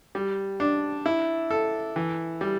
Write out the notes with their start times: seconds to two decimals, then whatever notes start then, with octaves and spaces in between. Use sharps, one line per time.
0.15 G3
0.60 D4
1.06 E4
1.51 A4
1.96 E3
2.41 G3